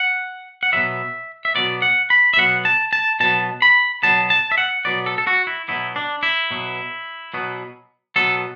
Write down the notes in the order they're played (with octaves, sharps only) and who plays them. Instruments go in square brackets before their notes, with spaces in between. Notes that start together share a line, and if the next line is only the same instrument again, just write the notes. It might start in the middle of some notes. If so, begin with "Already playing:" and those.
Already playing: [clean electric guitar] F#5
F#5
B2 F#3 B3 E5
E5
B2 F#3 B3 D5
F#5
B5
E5
B2 F#3 B3 F#5
A5
A5
B2 F#3 B3 A5
B5
B2 F#3 B3 A5
A5
E5
F#5
B2 F#3 B3 D5
A4
A4
F#4
E4
B2 F#3 B3 E4
D4
E4
B2 F#3 B3
B2 F#3 B3
B2 F#3 B3 A4